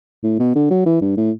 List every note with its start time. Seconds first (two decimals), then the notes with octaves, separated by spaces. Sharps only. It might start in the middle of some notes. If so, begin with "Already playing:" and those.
0.24 A2
0.39 B2
0.55 D3
0.70 F#3
0.86 E3
1.01 G2
1.17 A2